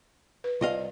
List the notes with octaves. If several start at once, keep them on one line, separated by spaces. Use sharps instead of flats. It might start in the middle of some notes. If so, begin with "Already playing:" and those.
B4
C2 F4 D#5 F5